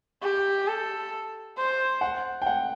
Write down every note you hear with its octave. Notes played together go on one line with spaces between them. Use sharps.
G4
A4
C5
F#5
G5
F#5